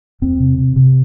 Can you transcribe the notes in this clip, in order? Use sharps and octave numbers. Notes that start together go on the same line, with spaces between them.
E2 C4
C3
C3
C3